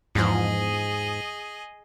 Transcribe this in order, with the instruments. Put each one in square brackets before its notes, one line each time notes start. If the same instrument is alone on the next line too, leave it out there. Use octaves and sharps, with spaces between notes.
[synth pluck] E2 F3 [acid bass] G#2 [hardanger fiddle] G#4 D#5